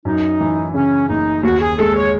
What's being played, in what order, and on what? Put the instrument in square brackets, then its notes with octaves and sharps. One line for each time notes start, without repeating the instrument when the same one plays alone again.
[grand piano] F#2 [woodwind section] D#4
[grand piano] E3
[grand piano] C#3 [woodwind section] C#4
[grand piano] F#1 [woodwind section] D#4
[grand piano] D#2 [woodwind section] F#4
[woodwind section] G#4
[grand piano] G#3 [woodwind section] A4
[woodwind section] C#5